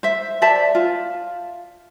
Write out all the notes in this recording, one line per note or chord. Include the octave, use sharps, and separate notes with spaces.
C5 E5
C5 D5 E5 A5
F4